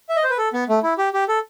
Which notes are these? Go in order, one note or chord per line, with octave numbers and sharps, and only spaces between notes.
E5
D#5
C5
B4
A4
B3
A3
E4
G4
G4
A4